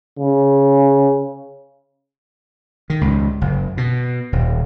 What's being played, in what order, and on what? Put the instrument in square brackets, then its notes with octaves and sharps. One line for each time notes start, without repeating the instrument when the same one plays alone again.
[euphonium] C#3
[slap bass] D#3
C#2 G#2
F#1
B2
D#1